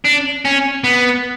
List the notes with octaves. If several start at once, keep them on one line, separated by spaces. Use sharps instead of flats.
D4
C#4
B3